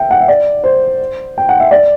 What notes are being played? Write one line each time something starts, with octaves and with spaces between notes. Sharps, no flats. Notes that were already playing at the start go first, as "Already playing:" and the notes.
Already playing: E5 G5
F#5
E5
D5
C5
G5
F#5
E5
D5